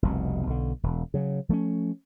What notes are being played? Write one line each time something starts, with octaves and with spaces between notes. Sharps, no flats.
F1 C2 B2
B1 D3
E1
C#3 F#3
F3 A3 A#3 C#4